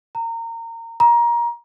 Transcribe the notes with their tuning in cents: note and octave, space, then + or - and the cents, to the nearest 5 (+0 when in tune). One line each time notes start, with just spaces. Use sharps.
A#5 -25
A#5 +20